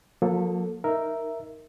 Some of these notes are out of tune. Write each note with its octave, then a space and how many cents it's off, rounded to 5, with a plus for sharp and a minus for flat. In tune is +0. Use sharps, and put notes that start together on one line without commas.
F3 +45 A#3 +5 A4 +0
D#4 +10 A#4 +0 E5 +0